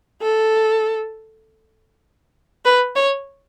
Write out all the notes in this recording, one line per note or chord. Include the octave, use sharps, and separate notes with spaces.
A4
B4
C#5